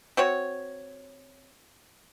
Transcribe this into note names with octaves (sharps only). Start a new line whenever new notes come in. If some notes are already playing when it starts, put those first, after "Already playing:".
C4 F#4 C#5